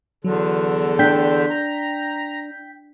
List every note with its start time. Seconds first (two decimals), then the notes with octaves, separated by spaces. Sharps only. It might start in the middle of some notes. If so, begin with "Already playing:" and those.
0.24 E2 D3 F#3
0.99 D4 G5 G6 B6
1.50 A#5